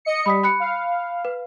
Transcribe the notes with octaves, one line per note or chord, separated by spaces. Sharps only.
D#5 C#7
G3 B5 D#6 B6
B5 F#6 C#7
F5
B4